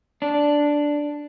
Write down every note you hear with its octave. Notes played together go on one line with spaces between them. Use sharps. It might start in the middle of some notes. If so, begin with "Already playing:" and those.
D4